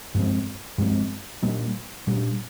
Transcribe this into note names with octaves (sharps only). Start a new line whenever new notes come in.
G2 F3 G#3 C4
G2 F3 G#3 C4
A#2 G3 A#3 D4
A#2 G3 A#3 D4